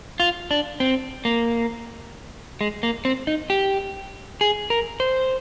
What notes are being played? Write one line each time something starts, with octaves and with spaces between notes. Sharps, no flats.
F4
D4
C4
A#3
G#3
A#3
C4
D#4
G4
G#4
A#4
C5